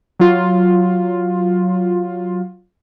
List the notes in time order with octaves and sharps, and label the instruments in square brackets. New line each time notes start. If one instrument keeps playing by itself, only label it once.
[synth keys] F#3 F4